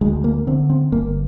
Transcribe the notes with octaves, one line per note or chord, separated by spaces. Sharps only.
D2 G#3
A#3
D3 C4
C4
G1 A#3